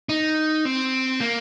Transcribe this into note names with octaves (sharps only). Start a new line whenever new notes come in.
D#4
C4
A#3